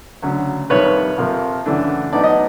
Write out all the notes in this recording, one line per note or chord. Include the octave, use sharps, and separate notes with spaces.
D2 C#3 F#3
F2 C3 D#3 G3 B4 C#5
F2 C3 F3 A#3
F#2 C#3 E3 A3 D4
A2 F#3 B3 D#4 D5
D#5